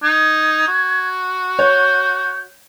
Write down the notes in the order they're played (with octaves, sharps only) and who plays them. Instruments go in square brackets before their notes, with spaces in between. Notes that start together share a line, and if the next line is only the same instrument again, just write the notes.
[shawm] D#4 [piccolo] G#6
[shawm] F#4
[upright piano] C#5 [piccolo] G6